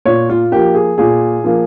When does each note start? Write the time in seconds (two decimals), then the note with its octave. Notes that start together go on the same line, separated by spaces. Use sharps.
0.06 A#2 C#5
0.29 F4
0.52 F3 A#3 G4
0.75 G#4
0.98 A#2 G#4
1.44 F3 A#3